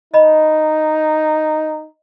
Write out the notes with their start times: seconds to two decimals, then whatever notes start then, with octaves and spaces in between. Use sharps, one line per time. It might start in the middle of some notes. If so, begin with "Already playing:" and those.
0.14 D#4 D#5 B5